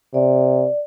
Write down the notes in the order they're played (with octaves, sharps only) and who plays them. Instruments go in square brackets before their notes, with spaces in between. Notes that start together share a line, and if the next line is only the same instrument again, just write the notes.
[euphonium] C3 [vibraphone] D5